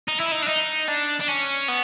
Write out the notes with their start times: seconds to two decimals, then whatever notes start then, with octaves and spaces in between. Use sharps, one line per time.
0.08 D#4
0.20 E4
0.32 D#4
0.43 D4
0.48 D#4
0.88 D4
1.20 D4
1.28 C#4
1.68 B3